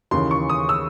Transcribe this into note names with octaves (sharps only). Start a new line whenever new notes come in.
D#2 C#3 E3 C6
C#6
D#6
E6